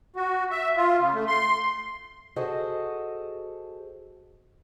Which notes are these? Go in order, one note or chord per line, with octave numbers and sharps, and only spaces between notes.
F#4
E5
F4
C#3
A3
C6
F#4 G#4 A4 C5 D#5